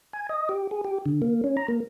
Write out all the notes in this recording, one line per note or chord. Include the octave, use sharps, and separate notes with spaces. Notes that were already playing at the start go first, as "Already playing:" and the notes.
G#5
D#5
G4
G#4
G4
D3
A#3
C#4
A#5
A#3